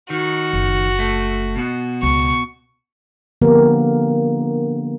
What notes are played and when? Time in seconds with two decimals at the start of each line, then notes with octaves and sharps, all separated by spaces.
0.10 D#3 F#4
0.53 F#1
0.99 A3
1.56 B2 F#4
2.03 C#2 C#6
3.42 D3 F3 A#3 B3 G4 A#4